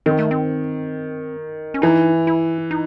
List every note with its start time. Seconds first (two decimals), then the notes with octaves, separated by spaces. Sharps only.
0.06 D#3 C4
0.19 A3
0.31 C4
1.74 C#4
1.82 E3 D#4
2.27 E4
2.71 D#4